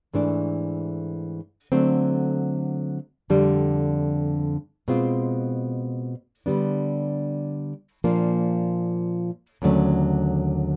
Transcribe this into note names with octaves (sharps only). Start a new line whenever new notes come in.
G#2 E3 A3 D4
D3 F#3 A3 C4
F2 D3 G3
B2 G#3 C4 F4
D3 G3 B3 D4
A#2 F3 A#3 D4
D#2 D3 F#3 A3 C#4